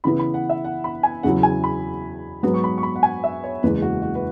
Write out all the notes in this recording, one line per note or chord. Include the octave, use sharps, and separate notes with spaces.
C#3 E3 B3 E4 B5
B5
F#5
E5
F#5
B5
G#5
E2 C#3 F#3 E4 F#5
G#5
B5
G#2 F#3 B3
C#6
B5
C#6
B5
F#5
G#5
E5
C#5
F#1 E2 E3 G#3 B4
F#4
F#4
B4